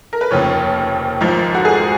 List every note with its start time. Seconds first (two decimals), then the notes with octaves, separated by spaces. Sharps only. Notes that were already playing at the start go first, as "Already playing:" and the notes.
0.13 A#4
0.21 B4
0.31 F1 D#2 C#3 F3 C#5
1.21 G#1 G#2 F3
1.54 F#4
1.65 G#4